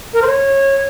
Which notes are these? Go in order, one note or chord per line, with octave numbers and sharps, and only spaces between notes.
A#4
C5
C#5